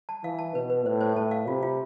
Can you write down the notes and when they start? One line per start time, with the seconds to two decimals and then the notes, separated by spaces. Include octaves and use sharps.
0.09 A5
0.24 E3 F5
0.39 A5
0.55 B2 B4
0.70 B4
0.85 A2 C5
1.01 C5
1.16 A2 A5
1.31 F5
1.47 C3 F4
1.63 F4